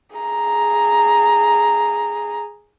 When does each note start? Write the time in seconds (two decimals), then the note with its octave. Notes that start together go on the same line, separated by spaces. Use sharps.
0.16 G#4 A#5